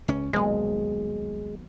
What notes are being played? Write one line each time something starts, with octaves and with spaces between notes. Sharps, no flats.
C#2 C#4
D#1 B1 G#3